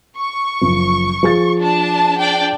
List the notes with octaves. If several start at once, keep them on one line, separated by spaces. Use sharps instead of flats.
C#6
F#1 F3
F3 G#4 A6
D4 A5
D4 D5 G5